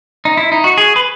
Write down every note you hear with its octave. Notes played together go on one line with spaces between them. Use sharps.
D#4
E4
D#4
F#4
G#4
B4